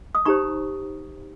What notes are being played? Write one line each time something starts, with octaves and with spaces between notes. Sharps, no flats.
D#6
D#4 G4 C5 A#5 C#6